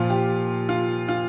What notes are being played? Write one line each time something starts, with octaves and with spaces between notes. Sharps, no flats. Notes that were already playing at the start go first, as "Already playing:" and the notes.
Already playing: A#2 F3 F4
G4
F4
F4